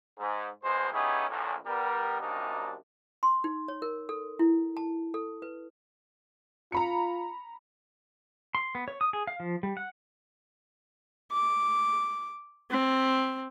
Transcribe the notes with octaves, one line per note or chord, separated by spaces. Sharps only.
G#2
A#1 E2 B2 G#3 C5
B3 C#4 D#4 E4 G4 G#4
A#1 E2 A2
G3 B3 A#4
C2 F#2 C3 A#3 D4 D#4
C6
D#4
C#5
A#4
A4
E4
A5
A4
B4
F4 A#5 B5 C#7
C6
B3
C#5
D#6
G#4
F5
F3
G3
F#5
D6
C4